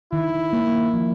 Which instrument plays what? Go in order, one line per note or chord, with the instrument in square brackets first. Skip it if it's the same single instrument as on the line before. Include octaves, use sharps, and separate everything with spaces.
[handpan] D#3 [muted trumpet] E4
[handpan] A#3
F3